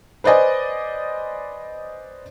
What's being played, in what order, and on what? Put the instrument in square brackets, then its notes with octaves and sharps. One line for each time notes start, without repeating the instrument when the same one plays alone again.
[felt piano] B4 C5 D5 D#5 G#5